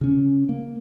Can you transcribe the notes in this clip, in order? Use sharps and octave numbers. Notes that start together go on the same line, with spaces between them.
C#3 C#4
A#3